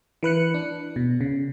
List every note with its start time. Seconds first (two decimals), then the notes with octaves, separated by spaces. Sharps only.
0.23 E3 B4 F#6 C#7
0.54 D4
0.96 B2
1.21 C#3